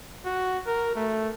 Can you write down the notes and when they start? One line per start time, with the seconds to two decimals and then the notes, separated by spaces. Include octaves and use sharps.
0.25 F#4
0.66 A#4
0.95 A3